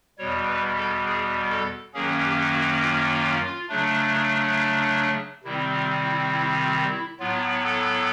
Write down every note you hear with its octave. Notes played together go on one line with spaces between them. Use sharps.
E2 B2 G3 C#5
B4
A4
G#4
A4
F#2 D#3 F#3 A#3 C#4 G#4
G4
F#4
F4
C#3 F#3 A3 D4
C3 D#3 G3 C4 E4
F4
E4
E4
F4
E4
A2 F#3 B3 F4
A4